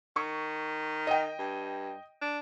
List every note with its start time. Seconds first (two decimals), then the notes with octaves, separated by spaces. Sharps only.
0.16 D#3 C#6
1.07 D#5 G5
1.39 G2
2.21 D4